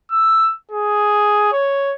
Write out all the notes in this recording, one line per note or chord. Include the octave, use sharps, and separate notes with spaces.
E6
G#4
C#5